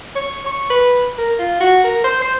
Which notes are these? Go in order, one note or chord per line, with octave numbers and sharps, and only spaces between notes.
C#5
C#6
B4
A#4
F4
F#4
A#4
C5
C5